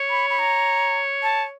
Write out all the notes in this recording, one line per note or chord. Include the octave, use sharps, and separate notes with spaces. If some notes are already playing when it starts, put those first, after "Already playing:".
Already playing: C#5
B5
B5
A#5
A5